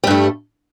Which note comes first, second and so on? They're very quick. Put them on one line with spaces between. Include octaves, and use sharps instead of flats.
G3 G2 A3